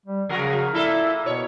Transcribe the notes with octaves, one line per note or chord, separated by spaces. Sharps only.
G3
C#3 F3 F#4 A#4
A#2 E4 A4 E5
B2 C#5